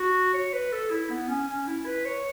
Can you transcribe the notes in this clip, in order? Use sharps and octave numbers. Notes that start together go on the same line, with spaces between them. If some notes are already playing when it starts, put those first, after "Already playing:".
Already playing: F#4
C#5
B4
A4
E4
B3
C#4
C#4
E4
B4
C#5